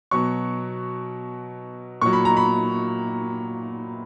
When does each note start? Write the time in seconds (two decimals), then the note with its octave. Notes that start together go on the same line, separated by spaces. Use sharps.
0.11 B2 F#3 C#6
2.01 A#2 F#3 C#6
2.13 B5
2.25 A#5
2.37 B5